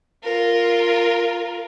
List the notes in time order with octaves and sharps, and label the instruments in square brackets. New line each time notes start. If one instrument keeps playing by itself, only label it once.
[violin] F4 A#4